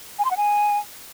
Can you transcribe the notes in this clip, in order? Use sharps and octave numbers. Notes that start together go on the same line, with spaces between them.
G#5
C6
F#5
G#5